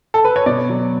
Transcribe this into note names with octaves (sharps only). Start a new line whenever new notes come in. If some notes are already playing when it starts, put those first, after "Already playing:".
A4
B4
C#5
B2 D5
F#3